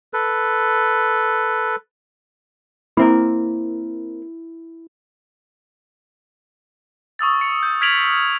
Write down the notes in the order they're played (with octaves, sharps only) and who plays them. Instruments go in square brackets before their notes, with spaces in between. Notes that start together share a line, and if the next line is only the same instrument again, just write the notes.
[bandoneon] A4 B4
[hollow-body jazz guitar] A#3 C4 A#4 [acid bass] E4
[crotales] C#6 D#6 E6 A6
C#7
G6
F6 G#6 B6 D7 F7 F#7